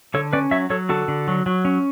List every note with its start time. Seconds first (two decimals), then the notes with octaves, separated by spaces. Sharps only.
0.14 D3 A4 C#5
0.33 C#4 B4 D5
0.51 F#3 C#5 E5
0.70 F#3 A4 C#5
0.89 D3 F#4 A4
1.08 D3
1.28 F#3
1.46 F#3
1.65 C#4